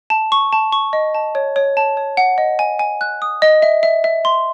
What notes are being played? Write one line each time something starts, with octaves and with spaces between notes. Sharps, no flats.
A5
C#6
A5
C#6
D#5
A5
C#5
C#5
A5
C#5
F#5
D#5
G#5
G#5
F#6
D#6
D#5
E5
E5
E5
C6